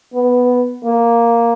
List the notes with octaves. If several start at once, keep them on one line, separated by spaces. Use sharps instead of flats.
B3
A#3